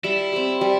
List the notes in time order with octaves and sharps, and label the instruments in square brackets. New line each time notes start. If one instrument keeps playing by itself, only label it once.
[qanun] G3 [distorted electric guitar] E4
[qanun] C4 G4
G3